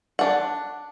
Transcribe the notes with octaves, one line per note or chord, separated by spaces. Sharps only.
D4 F#5